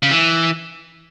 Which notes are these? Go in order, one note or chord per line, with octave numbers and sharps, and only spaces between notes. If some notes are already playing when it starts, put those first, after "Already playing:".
C#3
E3